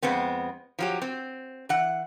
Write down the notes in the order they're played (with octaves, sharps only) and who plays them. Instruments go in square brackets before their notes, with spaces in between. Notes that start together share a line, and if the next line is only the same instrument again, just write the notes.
[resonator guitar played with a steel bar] F2 G#3 B3 C4
F3 F#3 G4
C4
E3 F#5